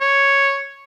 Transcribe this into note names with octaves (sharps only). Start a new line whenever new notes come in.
C#5